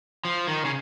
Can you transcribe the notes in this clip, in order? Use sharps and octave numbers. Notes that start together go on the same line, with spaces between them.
F3
D#3
C#3